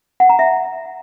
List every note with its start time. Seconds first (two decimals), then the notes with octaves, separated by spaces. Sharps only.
0.20 F#5
0.29 A#5
0.39 E5